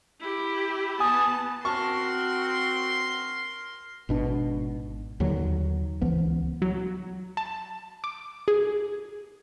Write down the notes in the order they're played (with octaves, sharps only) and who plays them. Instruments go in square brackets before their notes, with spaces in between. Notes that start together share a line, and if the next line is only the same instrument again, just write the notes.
[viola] E4 G4
[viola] B3 A5 [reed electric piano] G#5 D#6
[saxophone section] C4 F#4 [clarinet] A#4 [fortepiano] A5 C#6 [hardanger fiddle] C6
[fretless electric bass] G#1 B2 D4
D#2 D3 F#3
C#2 E3 F3 B3
[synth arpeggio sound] F#3
A5
D6
G#4